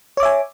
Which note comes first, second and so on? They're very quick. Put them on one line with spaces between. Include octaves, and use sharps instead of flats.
C#5 D6 E5 G#5